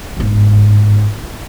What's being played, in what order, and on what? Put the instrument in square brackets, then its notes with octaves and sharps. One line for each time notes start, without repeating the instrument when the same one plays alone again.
[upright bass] G1 G#2